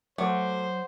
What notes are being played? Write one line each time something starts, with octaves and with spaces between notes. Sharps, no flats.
F#3 A3 C5 F#5 D6 A#6